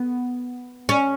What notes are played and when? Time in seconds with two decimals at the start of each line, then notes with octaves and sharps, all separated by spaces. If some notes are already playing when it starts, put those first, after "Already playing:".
Already playing: B3
0.89 C#4